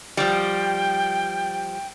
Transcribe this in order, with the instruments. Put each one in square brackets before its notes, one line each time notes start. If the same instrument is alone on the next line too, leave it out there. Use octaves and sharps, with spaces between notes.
[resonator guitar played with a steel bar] F3 G3 [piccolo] G5